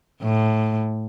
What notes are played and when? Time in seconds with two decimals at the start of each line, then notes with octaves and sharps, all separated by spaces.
0.22 A2